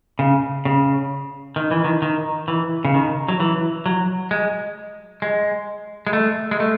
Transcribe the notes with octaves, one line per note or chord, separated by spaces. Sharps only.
C#3
C#3
D#3
E3
D#3
D#3
E3
C#3
D#3
F#3
E3
F#3
G#3
G#3
G#3
A3
G#3
A3